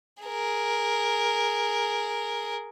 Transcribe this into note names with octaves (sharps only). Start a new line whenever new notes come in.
G#4 A#4